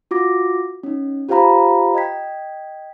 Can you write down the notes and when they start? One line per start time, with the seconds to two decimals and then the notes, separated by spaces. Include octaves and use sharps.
0.11 F4 F#4 D6 A#6
0.83 C#4 D#4
1.29 F4 G4 C5 F5 A#5 B5
1.94 D#5 G5 G#6 B6